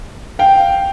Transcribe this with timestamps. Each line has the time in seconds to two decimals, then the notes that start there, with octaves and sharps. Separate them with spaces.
0.39 F5 G5